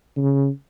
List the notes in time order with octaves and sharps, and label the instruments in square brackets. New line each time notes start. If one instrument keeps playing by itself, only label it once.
[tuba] C#3